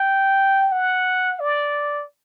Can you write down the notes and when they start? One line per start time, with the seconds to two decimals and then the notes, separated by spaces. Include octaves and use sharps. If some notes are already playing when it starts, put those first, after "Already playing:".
Already playing: G5
0.72 F#5
1.40 D5